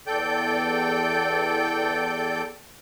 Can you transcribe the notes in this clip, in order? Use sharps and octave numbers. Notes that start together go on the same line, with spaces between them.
E2 A4 D5 G5 G6